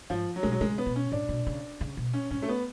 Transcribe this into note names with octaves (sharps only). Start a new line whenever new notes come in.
G#2 F3
F#3
B2 G#3
F#3
C#3 G#3
B3
B2
C#4
A2 D4
B2
C#3
C#3
B2
C#4
G#2 C#4
A3
B3